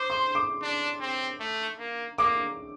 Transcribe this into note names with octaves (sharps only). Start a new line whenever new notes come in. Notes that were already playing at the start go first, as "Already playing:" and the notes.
Already playing: C5 D6
C6
D6
D4
C4
A3
A#3
A#3 D6